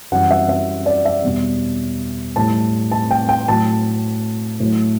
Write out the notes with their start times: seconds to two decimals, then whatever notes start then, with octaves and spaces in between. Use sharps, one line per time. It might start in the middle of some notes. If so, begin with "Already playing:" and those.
0.12 F#2 E3 G3 F#5
0.31 E5
0.49 E5
0.86 D5
1.05 E5
1.24 E2 B2 G3
2.36 A2 G3 A5
2.92 A5
3.11 G5
3.29 G5
3.48 A2 F#3 A5
4.60 A2 F#3